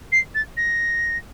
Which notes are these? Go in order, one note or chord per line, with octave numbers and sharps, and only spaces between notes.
C7
A6
A#6